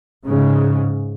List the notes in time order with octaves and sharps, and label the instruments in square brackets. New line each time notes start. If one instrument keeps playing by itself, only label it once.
[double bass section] G#2 C#3